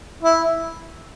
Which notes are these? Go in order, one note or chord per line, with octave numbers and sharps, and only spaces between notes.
E4